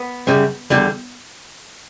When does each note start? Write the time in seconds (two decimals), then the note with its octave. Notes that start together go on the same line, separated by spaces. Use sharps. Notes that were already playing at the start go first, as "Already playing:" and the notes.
Already playing: B3
0.27 F#2 C#3 G3
0.70 E2 D3 G3